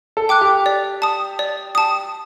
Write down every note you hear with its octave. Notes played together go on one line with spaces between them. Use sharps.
A4
G5 D6 F#6
G4
D5
A5 D#6
D5
A5 D#6